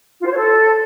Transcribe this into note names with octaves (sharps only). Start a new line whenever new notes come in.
F4
C5
C#5
A4